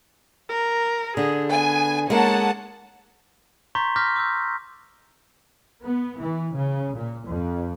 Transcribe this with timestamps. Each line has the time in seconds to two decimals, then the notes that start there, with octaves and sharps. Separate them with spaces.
0.49 A#4
1.17 D3 G#4
1.51 B3 G#5
2.10 G#3 A#3 C#4 D#4 F#5 A5
3.75 A#5 C6 C#6 G6 A6 B6
3.96 D6 F6 G6 A#6 B6
4.16 D6 E6 G6
5.82 B3
6.19 E3
6.54 C#3
6.95 A#2
7.25 F2